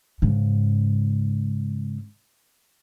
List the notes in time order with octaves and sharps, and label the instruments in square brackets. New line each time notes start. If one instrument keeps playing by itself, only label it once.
[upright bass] G#2 C#3